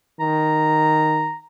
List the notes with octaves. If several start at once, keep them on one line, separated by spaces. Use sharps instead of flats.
D#3 A#5